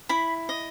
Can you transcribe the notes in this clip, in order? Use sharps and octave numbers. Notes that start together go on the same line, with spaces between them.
E4 B5
D#5